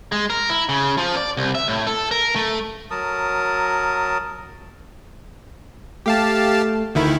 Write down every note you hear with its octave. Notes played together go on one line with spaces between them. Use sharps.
G#3
A#4
E4
C#3
F3
D5
C2
E5
A2
A4
A#4
A3
F#3 A#4 A5 D#6
A3 G4 F5 A5
D2 D#3 E4